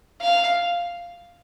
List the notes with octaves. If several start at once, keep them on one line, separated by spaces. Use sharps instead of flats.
F5